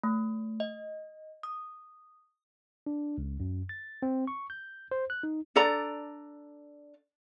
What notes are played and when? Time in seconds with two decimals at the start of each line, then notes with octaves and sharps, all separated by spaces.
0.04 A3
0.60 D#5
1.43 D#6
2.86 D4
3.18 C#2
3.40 F#2
3.69 A6
4.02 C4
4.27 C#6
4.50 G6
4.91 C5
5.10 F#6
5.23 D#4
5.55 D4 A4 D5 A#5